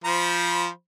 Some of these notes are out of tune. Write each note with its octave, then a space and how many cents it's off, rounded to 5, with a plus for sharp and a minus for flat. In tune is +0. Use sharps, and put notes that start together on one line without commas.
F3 -5 C5 +0 B5 -35